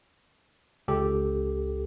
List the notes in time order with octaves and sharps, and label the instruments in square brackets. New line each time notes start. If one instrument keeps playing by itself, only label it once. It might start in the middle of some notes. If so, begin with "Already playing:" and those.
[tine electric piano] C#2 G4 A4